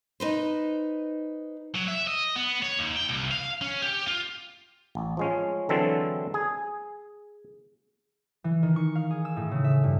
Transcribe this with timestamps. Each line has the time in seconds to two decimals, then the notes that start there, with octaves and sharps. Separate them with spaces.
0.20 D#4 B4 C5
1.75 F#3
1.88 E5
2.07 D#5
2.36 B3
2.63 C#5
2.79 D#2
2.96 G5
3.09 C2
3.31 F5
3.61 C#4
3.82 G4
4.08 F4
4.95 A1
5.17 F3 G#3 C#4
5.69 D3 E3 F#3 G#3 C4 A4
6.34 G#4
8.44 E3
8.63 D#3
8.76 C#6
8.95 F5
9.11 G#4
9.25 E6
9.37 A2
9.51 C#3
9.64 E5
9.84 G2